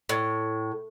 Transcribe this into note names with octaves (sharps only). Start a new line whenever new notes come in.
A2